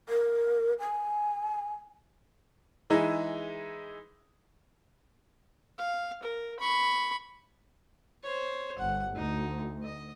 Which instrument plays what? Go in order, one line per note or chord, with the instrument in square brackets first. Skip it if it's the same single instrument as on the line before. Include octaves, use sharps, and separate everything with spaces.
[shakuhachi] A#4
G#5
[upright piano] E3 G#3 D#4 E4 G#4
[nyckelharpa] F5
A#4
B5 C#6
C5 C#5
[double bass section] G1 [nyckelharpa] F#5
[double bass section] D2 [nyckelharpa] D#4
[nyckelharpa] D#5